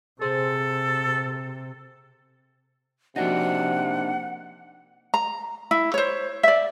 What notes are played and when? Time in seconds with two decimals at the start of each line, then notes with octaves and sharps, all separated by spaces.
0.21 C3 G#4 A4 C5
3.16 C3 F3 A#3 D4 D#4 F#4 F#5 A#6
5.14 A#5
5.71 E4
5.94 C5 C#5
6.43 D5 E5